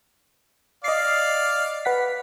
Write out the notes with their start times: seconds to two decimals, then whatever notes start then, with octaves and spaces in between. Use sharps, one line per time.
0.84 D5 D#5 F5 C7
1.85 B4 F#5 B6